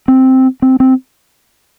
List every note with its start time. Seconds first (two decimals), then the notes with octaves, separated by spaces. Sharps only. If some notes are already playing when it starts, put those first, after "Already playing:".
0.08 C4
0.62 C4
0.80 C4